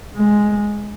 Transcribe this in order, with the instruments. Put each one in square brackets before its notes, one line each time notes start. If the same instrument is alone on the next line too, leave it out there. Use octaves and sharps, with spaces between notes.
[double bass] G#3